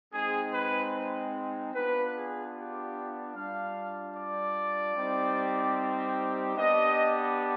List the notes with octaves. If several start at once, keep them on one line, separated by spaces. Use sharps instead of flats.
G#3 C4 D#4 G#4
B4
B3 D4 F4 B4
G#4
G4
G3 D4 F4 F5
D5
G3 C4 D#4 G4
B3 D4 G4 D#5